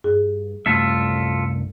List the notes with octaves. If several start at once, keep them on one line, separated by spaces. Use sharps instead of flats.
G2 G#4
C2 F#2 A3 F4 A4 E5